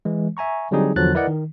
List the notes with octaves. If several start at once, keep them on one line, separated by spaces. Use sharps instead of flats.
E3 G#3
E5 G#5 A#5 C#6
D3 F#3 G3 C4 D#4 G#4
E2 D3 F3 F#3 F#6 A6
E4 A#4 B4 D5 D#5 F#5
D#3